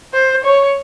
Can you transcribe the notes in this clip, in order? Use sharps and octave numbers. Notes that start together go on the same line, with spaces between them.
C5
C#5